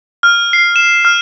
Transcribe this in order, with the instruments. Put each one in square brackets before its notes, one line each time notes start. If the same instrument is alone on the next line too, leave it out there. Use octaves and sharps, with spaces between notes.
[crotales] F6
C7
E7
F6